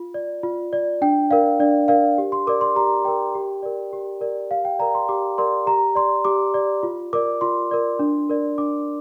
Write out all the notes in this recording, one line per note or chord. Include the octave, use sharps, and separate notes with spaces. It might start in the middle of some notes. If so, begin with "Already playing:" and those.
Already playing: F4
D5
F4
D5
D4 G5
A#4 D5 F5
D4 D5
A#4 D5 F5
G4
C6
A#4 D5 D6
C6
G4 A#5
A#4 D5 G5
G4
A#4 D5
G4
A#4 D5
G4 F5
G5
A#4 D5 A#5
C6
G4 D6
A#4 D5 C6
G4 A#5
D5 C6
G4 D6
D5
F4
A#4 D5 D6
F4 C6
A#4 D5
D4
A#4 D5
D4 D6